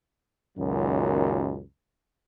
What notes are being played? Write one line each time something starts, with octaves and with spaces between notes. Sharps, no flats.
C#2 F#2 A#2 D#3 F#3